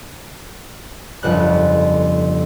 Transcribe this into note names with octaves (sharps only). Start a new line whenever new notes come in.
G1 F2 C#3 F#6